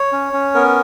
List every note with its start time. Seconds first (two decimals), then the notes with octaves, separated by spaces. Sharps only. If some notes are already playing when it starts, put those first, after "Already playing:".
Already playing: C#5
0.12 C#4
0.33 C#4
0.55 B3 A#4